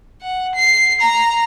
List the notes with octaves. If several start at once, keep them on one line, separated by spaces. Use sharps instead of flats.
F#5
C7
A#5